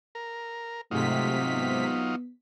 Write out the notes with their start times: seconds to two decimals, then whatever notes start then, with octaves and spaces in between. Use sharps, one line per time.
0.15 A#4
0.91 G#2 C3 F#3 A3 D#4 F4 B6
1.55 B3